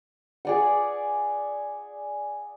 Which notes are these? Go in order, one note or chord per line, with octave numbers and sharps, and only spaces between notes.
G#4 D5 F#5